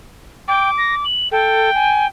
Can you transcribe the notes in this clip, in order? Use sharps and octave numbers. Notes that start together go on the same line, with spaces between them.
G5 D6
A#6
F#7
A4 G5
G#5